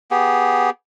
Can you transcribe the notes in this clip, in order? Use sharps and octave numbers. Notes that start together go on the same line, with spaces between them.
B3 G4 G#4